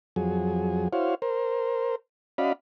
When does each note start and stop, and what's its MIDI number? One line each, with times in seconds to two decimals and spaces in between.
0.16 0.88 41
0.16 0.88 54
0.16 0.88 68
0.93 1.15 64
0.93 1.15 66
0.93 1.15 72
0.93 1.15 73
0.93 1.15 77
1.22 1.96 70
1.22 1.96 72
2.38 2.53 61
2.38 2.53 66
2.38 2.53 74
2.38 2.53 75
2.38 2.53 77
2.38 2.53 83